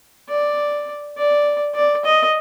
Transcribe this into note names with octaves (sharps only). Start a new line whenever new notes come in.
D5
D5
D5
D#5